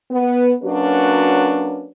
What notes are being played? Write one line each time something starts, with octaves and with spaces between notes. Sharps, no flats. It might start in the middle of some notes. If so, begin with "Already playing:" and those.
B3
F#3 A#3 C#4 D4 F#4 B4